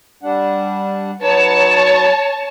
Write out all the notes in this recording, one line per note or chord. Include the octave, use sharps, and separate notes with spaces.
G3 D4 F#5
F#3 D#4 B4 C#5 A5